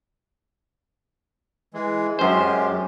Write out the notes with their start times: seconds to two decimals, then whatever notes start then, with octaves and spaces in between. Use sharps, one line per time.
1.74 E3 G#3
2.19 F#2 G#3 C#4 G4 C5